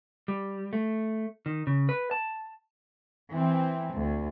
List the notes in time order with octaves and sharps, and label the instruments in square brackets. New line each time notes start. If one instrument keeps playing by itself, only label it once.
[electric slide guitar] G3
A3
D#3
C#3
B4
A5
[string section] E3 C4
D2